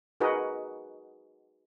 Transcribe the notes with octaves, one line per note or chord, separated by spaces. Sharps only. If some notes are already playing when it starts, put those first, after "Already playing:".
D#4 F#4 G#4 A#4 B4 D#5